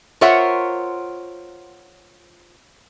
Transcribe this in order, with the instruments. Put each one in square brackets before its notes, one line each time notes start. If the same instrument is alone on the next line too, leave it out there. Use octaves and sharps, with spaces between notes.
[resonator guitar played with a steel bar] F4 A#4 C5 C#5 E5 F#5